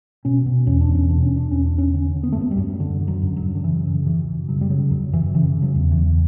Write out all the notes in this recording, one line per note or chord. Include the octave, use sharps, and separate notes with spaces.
B2 C#4
B2
E2 C#4
D4
E2
C#4
B2 D4
C#4
B2 D4
E2 C#4
D4
E2 C#4
D3 C#4
D3
B3
A3
F#2 B3
G3
F#2
D3
D3
F#3
F#2
F#3
F#2
D3
C#3 E3
C#3
F#2 E3
F#2
C#3 F#3
G3
C#3 F#3
F#2 F#3
F#2 E3
C#3 E3
C#3
F#3
E2
E3
E2